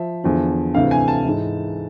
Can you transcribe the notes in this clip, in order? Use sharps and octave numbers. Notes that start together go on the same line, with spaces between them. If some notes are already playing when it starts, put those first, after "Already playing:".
Already playing: F3 E5
E2 D3 F3
D2 C3 E3 F5
G#5
A5
G#2 E3